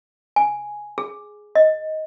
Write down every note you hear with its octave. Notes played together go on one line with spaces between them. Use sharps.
G#5
G#4
D#5